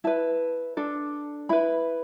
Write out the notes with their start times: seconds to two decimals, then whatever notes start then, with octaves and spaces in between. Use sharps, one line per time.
0.04 E4 B4 A5
0.77 D4 A4
1.49 E4 B4 B5